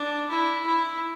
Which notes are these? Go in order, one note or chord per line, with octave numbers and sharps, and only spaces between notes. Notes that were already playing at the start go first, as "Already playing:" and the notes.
Already playing: D4
E4
E4